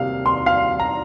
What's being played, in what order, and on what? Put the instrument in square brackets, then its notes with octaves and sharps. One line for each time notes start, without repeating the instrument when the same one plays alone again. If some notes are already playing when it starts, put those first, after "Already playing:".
Already playing: [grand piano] C3 G3 A#3 F5
C6
F5
A#5